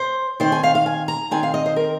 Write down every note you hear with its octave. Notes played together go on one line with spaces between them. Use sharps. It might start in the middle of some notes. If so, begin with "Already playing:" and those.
Already playing: C5
D#3 C4 C5
G#5
F5
F5
G#5
A#5
D#3 C4 G#5
F5
D#5
C5
A#4